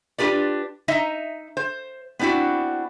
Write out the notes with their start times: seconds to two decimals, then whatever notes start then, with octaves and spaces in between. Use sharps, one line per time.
0.18 D4 F4 G4 B4 D5
0.88 D#4 D#5 E5 A#5
1.57 C5
2.19 B3 C4 D4 E4 F#4